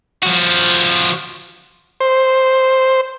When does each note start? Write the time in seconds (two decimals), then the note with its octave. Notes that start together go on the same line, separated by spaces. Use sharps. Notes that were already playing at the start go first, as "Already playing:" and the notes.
0.23 F3 F#4
2.00 C5